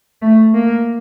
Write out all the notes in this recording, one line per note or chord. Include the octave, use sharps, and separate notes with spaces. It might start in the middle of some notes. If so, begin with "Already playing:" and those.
A3
A#3